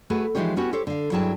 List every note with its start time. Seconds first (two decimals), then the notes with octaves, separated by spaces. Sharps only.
0.10 A3 F#4 G#4 B4
0.35 E3 F3 G#3 D#4 G4 C#5
0.56 B3 C#4 E4 F#4 G4
0.73 G4 A4 C5 C#5
0.87 D3 F5
1.12 G2 F#3 E4 G#4 G5 A5